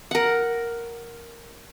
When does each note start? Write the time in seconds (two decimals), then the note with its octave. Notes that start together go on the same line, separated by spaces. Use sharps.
0.11 A#4 F#5